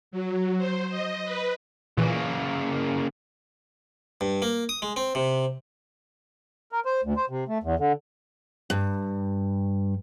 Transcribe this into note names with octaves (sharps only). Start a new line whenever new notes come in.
F#3
C5
D#5
B4
A#2 C#3 E3 A#3
G2
A#3
D#6
G#3
C4
C3
A#4
C5
D2
C5
C3
A3
E2
D3
G2